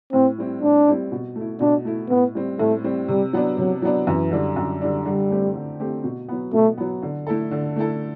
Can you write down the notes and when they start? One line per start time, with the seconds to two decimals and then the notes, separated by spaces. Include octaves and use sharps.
0.13 A2 C4
0.38 G3 C4 E4
0.62 A2 D4
0.87 G3 C4 E4
1.12 B2
1.36 A3 E4
1.60 B2 D4
1.85 A3 E4
2.10 A2 B3
2.35 G3 C4
2.59 A2 A3
2.84 G3 C4
3.08 C3 G3
3.33 F#3 B3 D4
3.58 C3 F#3
3.82 F#3 B3 D4
4.06 F#2 E3
4.31 D3 G3 D4
4.56 F#2
4.81 D3 G3 D4
5.06 D3 G3
5.30 A3 C4 G4
5.55 D3
5.80 A3 C4 G4
6.04 B2
6.29 F#3 B3
6.53 B2 A3
6.78 F#3 B3
7.02 D3
7.27 A3 E4 A4
7.51 D3
7.76 A3 E4 A4